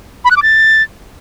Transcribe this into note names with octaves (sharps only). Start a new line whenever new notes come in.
B5
F#6
D6
A6